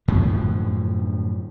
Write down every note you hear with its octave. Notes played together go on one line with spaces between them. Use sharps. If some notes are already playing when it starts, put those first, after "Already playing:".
F#2 A2 D3 F3